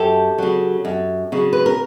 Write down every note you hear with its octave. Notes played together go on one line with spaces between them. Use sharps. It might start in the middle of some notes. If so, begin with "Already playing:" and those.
Already playing: F#2 G4 A4
C#3 F#3
F#2
C#3 F#3
B4
A#4